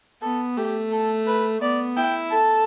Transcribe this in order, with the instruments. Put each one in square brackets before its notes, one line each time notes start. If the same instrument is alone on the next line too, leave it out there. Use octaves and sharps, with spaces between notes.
[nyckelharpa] B3 [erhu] A4
[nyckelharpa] A3 [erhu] G4
[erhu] A4
B4
[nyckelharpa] B3 [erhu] D5
[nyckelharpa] E4 [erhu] G5
[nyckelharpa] A4 [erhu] A5